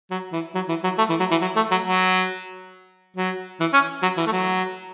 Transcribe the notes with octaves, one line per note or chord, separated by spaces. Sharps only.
F#3
E3
F#3
E3
F#3
A3
E3
F#3
E3
F#3
A3
F#3
F#3
F#3
E3
C#4
F#3
E3
A3
F#3